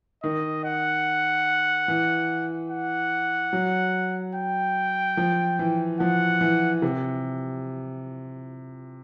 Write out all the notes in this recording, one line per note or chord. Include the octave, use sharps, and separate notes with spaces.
D#3 D#5
F#5
E3
F#5
F#3
G5
F3
E3
F3 F#5
E3
C3